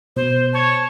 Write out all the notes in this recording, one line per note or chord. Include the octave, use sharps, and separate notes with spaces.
B2 C5
C#5 A5